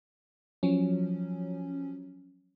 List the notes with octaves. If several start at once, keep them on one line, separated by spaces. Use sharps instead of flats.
F3 F#3 C#4